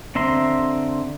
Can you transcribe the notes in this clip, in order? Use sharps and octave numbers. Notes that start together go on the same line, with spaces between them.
D3 C4 E5 A#5 C6